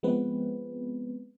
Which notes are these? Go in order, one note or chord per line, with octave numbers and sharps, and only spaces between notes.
F3 G#3 B3 C4 B4